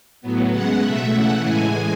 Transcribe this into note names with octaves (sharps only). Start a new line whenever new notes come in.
A2 F#3 B3
C#3 G#3 B3 F#5
B2 A3 E5
C#3 E3 A3 F#5
A2 E3 G#3 G#5